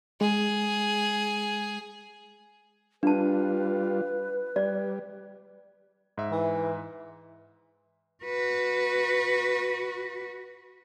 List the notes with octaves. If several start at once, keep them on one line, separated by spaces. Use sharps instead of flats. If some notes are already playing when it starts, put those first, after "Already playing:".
G#3 G#4
G3 D4 F4 B4 A5
G3 D5
G#2 E5
E3
F#4 B4